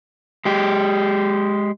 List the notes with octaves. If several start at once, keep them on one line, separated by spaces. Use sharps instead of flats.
G#3 G4